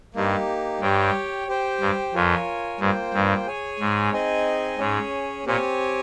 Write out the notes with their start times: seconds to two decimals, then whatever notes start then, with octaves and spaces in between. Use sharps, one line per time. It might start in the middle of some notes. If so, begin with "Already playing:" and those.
0.15 G2 A#3 D#4 G4
0.81 G2 G4 C#5 G5
1.48 G4 C5 G5
1.81 G2
2.14 F2 F4 A#4 C#5 G#5
2.80 G2 A#3 F4 C5 G5
3.14 G2
3.46 G#4 C#5 G#5
3.80 G#2
4.12 C4 D#4 G#4 D#5 G#5
4.78 G#2 C#4 G#4 C#5
5.46 A#2 C4 G4 C#5 G#5